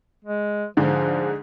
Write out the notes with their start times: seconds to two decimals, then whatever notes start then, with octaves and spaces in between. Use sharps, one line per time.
0.25 G#3
0.77 G#2 D3 F3 G#3